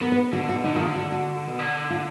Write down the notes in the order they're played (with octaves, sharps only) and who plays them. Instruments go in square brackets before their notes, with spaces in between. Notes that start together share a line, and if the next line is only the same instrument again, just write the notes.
[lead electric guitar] B3 [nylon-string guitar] A#4
[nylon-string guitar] B4
[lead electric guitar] D3 [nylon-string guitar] F#4
[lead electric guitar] B2 [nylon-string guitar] F#4
[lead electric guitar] D3 [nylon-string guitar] D#4
[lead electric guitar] D#3 [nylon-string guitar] F#4
[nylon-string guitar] F4
[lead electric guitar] D3
[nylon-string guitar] F#4
F#4
[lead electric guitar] B2
D3
[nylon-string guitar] F4